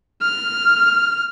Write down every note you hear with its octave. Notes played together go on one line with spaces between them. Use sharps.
F6